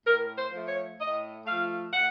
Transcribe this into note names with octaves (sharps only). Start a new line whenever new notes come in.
A2 A#4
C5
F3 A3
C#5
A2 D#5
F3 A3 F5
A2 F#5